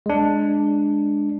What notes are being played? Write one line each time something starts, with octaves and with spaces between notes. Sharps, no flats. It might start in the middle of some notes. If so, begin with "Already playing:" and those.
G#3 D4